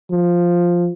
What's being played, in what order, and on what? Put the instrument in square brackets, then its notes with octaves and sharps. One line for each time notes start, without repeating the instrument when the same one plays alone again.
[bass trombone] F3